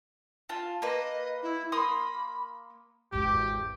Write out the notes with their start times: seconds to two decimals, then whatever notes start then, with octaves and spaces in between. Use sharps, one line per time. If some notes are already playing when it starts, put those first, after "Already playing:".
0.49 F4 A5
0.82 A#3 B4 D#5
1.42 E4
1.72 A#3 B5 C6 D#6
3.12 G#1 E2 G4